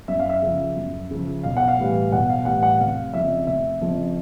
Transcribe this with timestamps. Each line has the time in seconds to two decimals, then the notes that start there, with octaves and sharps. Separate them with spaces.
0.08 F#2 E5
0.19 F5
0.29 E5
0.43 C#3 F3
0.76 F#2
1.11 C#3 F3
1.43 B1 F5
1.57 F#5
1.68 F5
1.78 A2 E3 G3
2.11 B1 F#5
2.29 F5
2.45 A2 E3 G3 F#5
2.63 F#5
2.79 F1 F5
3.14 F2 C#3 F3 E5
3.47 F1 E5
3.81 F2 C#3 F3